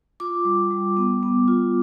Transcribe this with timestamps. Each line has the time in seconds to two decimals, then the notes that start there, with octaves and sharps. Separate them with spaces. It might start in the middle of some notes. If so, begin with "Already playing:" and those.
0.20 F4 D6
0.45 G3
0.71 G3
0.97 B3
1.23 B3
1.48 F4